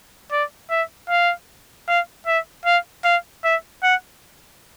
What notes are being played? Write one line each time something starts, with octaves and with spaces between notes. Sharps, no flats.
D5
E5
F5
F5
E5
F5
F5
E5
F#5